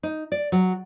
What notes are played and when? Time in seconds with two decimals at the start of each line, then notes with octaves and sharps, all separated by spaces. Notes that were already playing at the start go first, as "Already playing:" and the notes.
0.03 D#4
0.32 D5
0.52 F#3